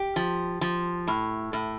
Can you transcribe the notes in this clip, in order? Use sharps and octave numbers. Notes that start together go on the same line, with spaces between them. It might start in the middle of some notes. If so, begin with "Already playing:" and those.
Already playing: G4
F3
F3
A2
A2